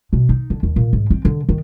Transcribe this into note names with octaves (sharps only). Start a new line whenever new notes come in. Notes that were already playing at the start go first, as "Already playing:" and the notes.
B2
D#4
D3
D#2
A#2
G#2
C4
D3
D#3